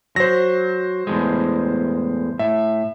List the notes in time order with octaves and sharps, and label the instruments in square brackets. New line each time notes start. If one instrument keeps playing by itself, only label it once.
[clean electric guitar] F#3 [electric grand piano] C5 A#6
[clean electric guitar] E2 A2 G#3
[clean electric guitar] A2 [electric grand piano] E5